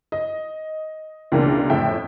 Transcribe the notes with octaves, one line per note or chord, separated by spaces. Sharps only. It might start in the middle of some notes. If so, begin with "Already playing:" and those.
D#5
C#2 B2 E3 A#3 D4
G1 F2 A2 E5 G5